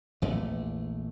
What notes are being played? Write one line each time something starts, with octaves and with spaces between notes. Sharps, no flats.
A#1 E2 A3